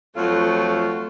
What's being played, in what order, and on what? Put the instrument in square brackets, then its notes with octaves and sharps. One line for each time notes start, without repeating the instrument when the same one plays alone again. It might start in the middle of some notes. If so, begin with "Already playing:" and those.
[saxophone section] F2 F#3 F4 [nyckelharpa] A3